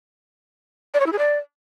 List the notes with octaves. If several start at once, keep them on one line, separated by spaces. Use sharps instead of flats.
D5
C#5
E4
G#4
D5